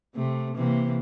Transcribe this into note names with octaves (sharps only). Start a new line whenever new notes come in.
C3 A3
C3 E3 A#3